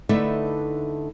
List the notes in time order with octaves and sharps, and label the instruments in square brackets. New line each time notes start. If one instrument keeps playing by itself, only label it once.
[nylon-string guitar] D3 A3 D#4 E4 B4 E5